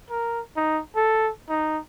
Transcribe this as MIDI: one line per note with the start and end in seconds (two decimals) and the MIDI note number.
0.10 0.40 70
0.56 0.80 63
0.95 1.30 69
1.49 1.78 63